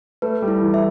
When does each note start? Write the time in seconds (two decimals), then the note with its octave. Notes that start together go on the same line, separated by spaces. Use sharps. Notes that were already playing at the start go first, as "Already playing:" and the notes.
0.22 A3 B4
0.42 G3
0.48 E4
0.61 E3
0.74 E5